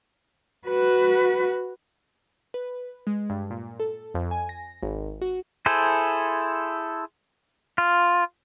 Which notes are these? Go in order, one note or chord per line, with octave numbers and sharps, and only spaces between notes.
F#4 B4
B4
G#3
G2
A#2
A4
F2
G#5
A#6
G#1
F#4
E4 G#4 A4 C5
F4